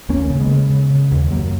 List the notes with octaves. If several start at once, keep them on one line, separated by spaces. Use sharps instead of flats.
D#2 A#3 C#4
C#3
G#3 B3
C#3
C#3
C#3
D#2
F#2 F#3 A#3